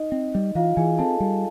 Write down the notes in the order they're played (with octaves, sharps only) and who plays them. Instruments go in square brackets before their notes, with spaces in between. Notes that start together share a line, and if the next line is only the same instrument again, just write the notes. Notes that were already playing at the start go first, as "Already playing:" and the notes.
Already playing: [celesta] D#4 D#5
[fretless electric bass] C4
G3
[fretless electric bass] E3 [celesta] F4 F5
[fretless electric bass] E3 [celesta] G#4 G#5
[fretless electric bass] C4 [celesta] A4 A5
[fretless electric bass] G3